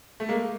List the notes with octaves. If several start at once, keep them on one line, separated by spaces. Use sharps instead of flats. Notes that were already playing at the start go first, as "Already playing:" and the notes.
A3
G#3 A#3